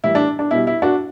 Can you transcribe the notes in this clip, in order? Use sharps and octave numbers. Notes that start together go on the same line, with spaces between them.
A2 E3 G3 E4
D4
D4
B2 G3 E4
E4
D4 F#4